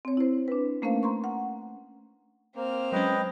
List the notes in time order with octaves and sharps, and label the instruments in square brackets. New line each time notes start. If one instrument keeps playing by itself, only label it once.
[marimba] C4 C#5
E4 C5
D4 B4
A3 A#3 C#4 A#4 C5 F5
A#5 C6 C#6
F#5
[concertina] A#3 [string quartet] C4 F6
[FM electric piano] F#3 G#3 C#4 [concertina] B4 D#5 G5